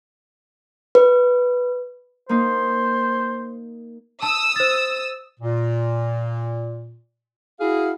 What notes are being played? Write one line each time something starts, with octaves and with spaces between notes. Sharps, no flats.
B4
A#3 D#4 C5
A5 D#6 E6
C5 A6
A#2
E4 F#4 G#4 F5